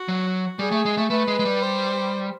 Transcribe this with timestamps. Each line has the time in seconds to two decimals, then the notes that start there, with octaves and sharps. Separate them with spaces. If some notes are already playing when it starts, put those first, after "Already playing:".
Already playing: F#4
0.08 F#3
0.59 G3 G#4
0.71 A3
0.85 G#3
0.97 A3
1.10 A3 B4
1.27 G#3
1.39 G#3
1.45 G3
1.62 C5